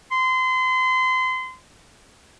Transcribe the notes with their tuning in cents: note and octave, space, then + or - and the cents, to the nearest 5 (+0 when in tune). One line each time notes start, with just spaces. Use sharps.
C6 -30